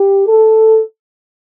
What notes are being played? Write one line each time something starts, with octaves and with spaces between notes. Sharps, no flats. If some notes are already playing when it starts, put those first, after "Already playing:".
Already playing: G4
A4